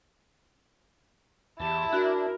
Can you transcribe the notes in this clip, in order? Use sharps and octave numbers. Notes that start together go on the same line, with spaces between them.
E2 E4 G4 A5
E2 D4 F#4 A#4 F#6